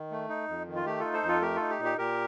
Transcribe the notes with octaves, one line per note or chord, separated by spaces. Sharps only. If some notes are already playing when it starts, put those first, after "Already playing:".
Already playing: D#3
A3
D#4
F2
D#3
F4
A3 G4
D#4 F4 A4
A4 C5
F2
F4 A4
A3 G4 A#4
D#4 F4 A4
G4
A#2
G4
A#2 G4 A#4